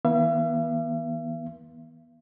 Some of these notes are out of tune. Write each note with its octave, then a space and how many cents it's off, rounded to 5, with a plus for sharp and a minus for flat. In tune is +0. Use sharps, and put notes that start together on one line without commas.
E3 -45 B3 -40 E5 +45